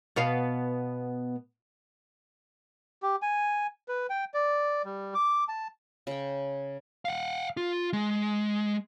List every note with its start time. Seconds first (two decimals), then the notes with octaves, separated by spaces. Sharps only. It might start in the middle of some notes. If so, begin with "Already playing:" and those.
0.16 B2 B3 F5
3.03 G4
3.22 G#5
3.88 B4
4.10 G5
4.34 D5
4.85 G3
5.14 D6
5.48 A5
6.07 C#3 G5
7.05 F5 F#5
7.57 F4
7.93 G#3